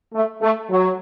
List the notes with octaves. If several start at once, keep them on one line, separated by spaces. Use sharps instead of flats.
A3
A3
F#3